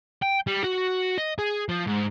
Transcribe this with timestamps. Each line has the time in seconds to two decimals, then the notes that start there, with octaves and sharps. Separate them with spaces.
0.22 G5
0.47 G3
0.64 F#4
1.18 D#5
1.38 G#4
1.69 F3
1.87 G#2